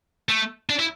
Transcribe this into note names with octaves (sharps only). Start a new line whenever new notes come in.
A3
D4
E4